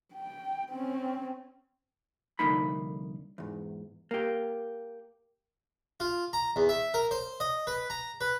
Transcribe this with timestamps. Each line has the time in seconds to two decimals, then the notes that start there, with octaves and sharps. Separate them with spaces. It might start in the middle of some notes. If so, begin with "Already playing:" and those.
0.13 G5
0.72 C4 C#4
2.39 C2 F2 D3 A#3 D#4 B5
3.38 E2 G#2
4.11 A#3 G4
6.00 F4
6.33 A#5
6.56 E2
6.69 E5
6.94 A#4
7.11 C5
7.40 D#5
7.67 B4
7.90 A#5
8.21 B4